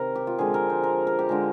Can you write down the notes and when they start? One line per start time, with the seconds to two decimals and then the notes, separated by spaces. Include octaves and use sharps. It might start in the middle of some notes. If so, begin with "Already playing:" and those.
Already playing: C3 D#3 A#4
0.15 G4
0.27 F4
0.38 D3 F3 G#3 G#4
0.54 A#4
0.70 C5
0.84 A#4
1.07 A#4
1.19 G4
1.29 D3 F3 G#3